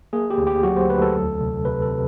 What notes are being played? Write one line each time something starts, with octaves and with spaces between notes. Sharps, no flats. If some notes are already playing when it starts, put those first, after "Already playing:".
A#3 G#4
G4
D2
G4
F#3 F#4
C5
D2 B4
A4
E2
C3
C3 B4
A4
C3